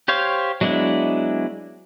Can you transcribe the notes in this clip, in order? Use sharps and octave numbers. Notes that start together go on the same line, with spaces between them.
G4 C5 C#5 F5
F#3 G#3 B3 D4 E4